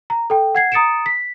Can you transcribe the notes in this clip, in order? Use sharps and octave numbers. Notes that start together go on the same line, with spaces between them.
A#5
A4 G5
F#5 G#6 C7
A#5 D#6 A6 C#7 D7 E7
B6